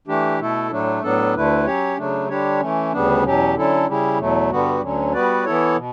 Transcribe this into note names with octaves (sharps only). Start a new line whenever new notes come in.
E3 A3 D4 G4
B2 A3 E4 A4
A2 F#3 A3 D4
A2 F#3 B3 D4 A4
D2 D3 A3 E4 B4
F#3 C#4 G4 C#5
C#3 F#3 A3 D4
D3 G3 D4 G4 C#5
E3 A3 C#4
D2 C#3 G3 B3 D4
E2 B2 F#3 C#4 G4
D3 F#3 C#4 E4 A4
C#3 G3 C#4 E4
E2 B2 F#3 A3
G2 D3 G3 B3 F#4
D2 D3 F#3 C#4
G3 B3 F#4 B4 D5
E3 B3 E4 A4 C#5
B2